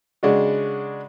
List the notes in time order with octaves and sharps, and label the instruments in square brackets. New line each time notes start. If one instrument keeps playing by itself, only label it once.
[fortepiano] C#3 G#3 D4 F#4